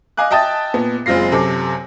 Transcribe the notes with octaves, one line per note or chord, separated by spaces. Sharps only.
D#5 F5 G#5 D6 F#6
D#5 E5 G5 A5 D#6 A6
A#2 B3
F#1 G#3 C4 F4 A#6 C7
F#2 C3 A4 D6